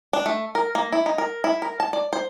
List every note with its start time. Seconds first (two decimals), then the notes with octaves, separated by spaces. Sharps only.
0.13 D4
0.26 A3
0.55 A#4
0.75 A#3
0.92 E4
1.06 D#4
1.18 A#4
1.44 E4
1.62 A#4
1.80 A5
1.93 D5
2.13 C5